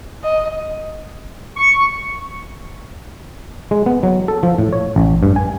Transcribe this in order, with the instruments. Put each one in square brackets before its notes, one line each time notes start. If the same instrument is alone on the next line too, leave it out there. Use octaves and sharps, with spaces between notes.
[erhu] D#5
[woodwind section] C#6
[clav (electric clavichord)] G#3
B3
F#3
A4
F3
A2
C#5
A1
G2
G#5